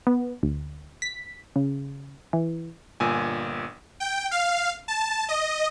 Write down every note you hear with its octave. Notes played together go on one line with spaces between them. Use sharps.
B3
D2
B6
C#3
E3
G1 A#2 G#5
G5
F5
A5
D#5